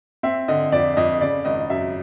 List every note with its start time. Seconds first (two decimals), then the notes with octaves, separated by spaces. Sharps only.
0.23 C4 E5
0.48 D3 D#5
0.72 F2 D5
0.97 F2 D#5
1.21 C#3 D5
1.45 G#1 D#5
1.70 F#2 E5